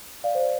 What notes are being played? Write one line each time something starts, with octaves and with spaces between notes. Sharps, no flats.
D5 F5
C5
D5